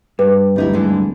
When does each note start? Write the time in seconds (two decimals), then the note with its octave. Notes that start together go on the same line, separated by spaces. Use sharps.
0.19 G2 G#4 B4
0.56 D1 G3 D#4 E4
0.73 D3 E3 G#3